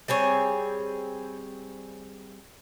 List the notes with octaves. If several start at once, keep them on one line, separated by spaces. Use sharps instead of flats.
G3 C4 G#4 C#5